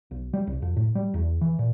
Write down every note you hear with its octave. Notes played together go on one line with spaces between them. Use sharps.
B1
G3
C2
F2
A2
G3
E2
E3
A#2